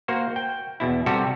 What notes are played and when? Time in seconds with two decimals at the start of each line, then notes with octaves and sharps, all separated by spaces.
0.08 A#3 F#4 C5
0.36 G5
0.80 E2 B2 E4
1.06 C3 G3 F#4 G4 A4